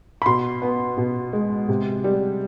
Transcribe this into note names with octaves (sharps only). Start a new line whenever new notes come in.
B5
B2 C6
B3
B2
G#3
C3
G3